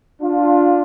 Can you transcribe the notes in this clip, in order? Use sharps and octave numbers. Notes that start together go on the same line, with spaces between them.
D4 F4